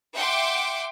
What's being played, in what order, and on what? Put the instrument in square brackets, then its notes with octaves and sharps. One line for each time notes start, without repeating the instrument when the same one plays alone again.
[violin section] E5 F#5 G5 C6 D6